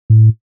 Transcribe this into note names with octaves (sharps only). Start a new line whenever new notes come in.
A2